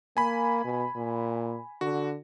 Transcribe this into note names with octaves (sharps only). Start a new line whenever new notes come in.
A#3 G#5 B5
B2
A#2
D3 F#4